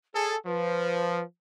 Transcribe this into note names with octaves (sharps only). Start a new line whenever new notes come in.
G#4 A4 C#5
F3 B4